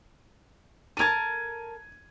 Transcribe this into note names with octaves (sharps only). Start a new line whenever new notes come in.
A4 A#4 A5 G#6 D#7